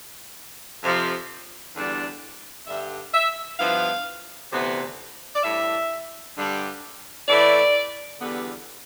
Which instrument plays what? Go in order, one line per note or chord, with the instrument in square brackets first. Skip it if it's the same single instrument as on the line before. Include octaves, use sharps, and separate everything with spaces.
[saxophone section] F2 C3 F3
E2 D3 G3 D4
G2 D3 G3 E5
E5
G2 F3 B3 E4 F5
D2 C3 E3 B3
D5
A2 G3 D4 E5
G2 D3 G3 D4
A2 E3 A3 E4 D5
E2 D3 G3 B3